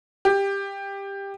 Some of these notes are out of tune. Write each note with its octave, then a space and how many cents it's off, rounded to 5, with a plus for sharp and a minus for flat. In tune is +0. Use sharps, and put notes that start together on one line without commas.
G4 +15